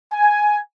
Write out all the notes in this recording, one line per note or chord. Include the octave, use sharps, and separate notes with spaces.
G#5